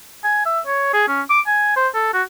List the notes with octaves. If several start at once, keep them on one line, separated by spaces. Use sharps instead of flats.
G#5
E5
C#5
G#4
C#4
D6
G#5
C5
A4
F#4